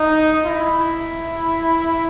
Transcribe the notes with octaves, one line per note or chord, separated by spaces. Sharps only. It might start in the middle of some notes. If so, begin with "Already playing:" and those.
Already playing: D#4
E4